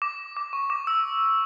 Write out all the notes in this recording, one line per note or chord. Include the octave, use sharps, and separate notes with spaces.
D6
D6
C#6
D6
E6